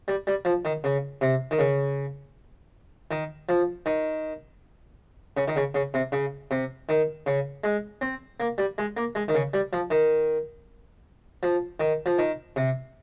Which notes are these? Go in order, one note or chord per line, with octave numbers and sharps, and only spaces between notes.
G3
G3
F3
D#3
C#3
C3
D#3
C#3
D#3
F3
D#3
C#3
D#3
C#3
C#3
C3
C#3
C3
D#3
C#3
G#3
C4
A#3
G3
G#3
A#3
G#3
D#3
C#3
G3
F3
D#3
F3
D#3
F3
D#3
C3